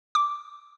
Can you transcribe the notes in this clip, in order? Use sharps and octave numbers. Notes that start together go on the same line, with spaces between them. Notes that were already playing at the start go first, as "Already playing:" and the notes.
D6